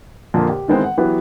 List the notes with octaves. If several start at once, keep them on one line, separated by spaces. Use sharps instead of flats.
F2 A#2 D3 A#3
G4
D#3 E3 G#3 B3 C4
F#5
E3 F#3 B3 G4